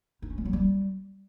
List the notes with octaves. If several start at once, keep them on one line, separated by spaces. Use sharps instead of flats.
D#4
C#4
G#3
F#3
G3